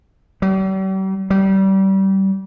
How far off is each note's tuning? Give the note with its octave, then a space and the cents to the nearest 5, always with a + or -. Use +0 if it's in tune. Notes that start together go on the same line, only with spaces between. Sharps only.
G3 -45
G3 -25